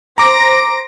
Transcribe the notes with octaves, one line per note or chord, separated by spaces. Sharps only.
C5 A#5 D6 A#6 D7